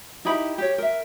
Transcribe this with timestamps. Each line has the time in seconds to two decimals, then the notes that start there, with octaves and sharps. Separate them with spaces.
0.25 D#4 E4 G4 B5
0.58 G4 C#5
0.78 A#4 E5